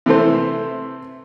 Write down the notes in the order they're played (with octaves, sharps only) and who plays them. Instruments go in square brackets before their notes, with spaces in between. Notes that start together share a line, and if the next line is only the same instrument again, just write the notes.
[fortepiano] C3 E3 A3 C5